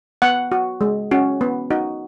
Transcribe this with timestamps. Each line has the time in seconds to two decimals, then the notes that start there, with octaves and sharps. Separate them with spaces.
0.22 B3 F#5
0.52 F#4
0.81 G#3
1.11 C#4 F#4
1.41 B3
1.71 D#4 F#4